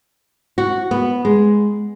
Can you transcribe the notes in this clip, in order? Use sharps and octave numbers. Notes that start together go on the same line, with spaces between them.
F#4
B3
G#3